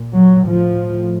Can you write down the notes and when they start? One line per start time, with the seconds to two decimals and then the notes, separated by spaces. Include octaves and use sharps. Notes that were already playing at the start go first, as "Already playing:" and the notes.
Already playing: A#2
0.16 F#3
0.49 A2 F3